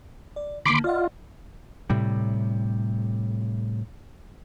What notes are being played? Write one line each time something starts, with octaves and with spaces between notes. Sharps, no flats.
D5
D3 D#3 A#3 B5 C6 D6
F4 D5 D#5 F#5
A2 C3 G3